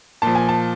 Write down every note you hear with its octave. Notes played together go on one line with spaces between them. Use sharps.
A#2 F3 A5
G#5
A5